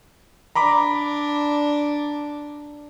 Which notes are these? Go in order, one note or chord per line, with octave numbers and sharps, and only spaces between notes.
D4 A#5 B5 D6